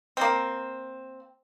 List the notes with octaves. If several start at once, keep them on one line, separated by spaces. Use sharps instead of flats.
A#3 C4